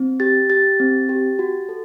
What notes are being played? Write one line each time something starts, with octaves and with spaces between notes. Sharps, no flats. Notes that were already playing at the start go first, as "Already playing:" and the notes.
Already playing: C4
G4 A6
G4 A6
C4
G4
F#4
A4